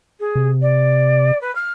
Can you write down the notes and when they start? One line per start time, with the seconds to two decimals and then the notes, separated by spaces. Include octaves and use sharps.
0.19 G#4
0.35 C3
0.61 D5
1.41 B4
1.55 F6